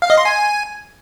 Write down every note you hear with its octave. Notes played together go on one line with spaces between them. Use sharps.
F5
D#5
C6
G#5